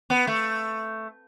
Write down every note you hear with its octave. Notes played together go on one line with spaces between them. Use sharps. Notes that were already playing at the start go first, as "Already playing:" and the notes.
B3
A3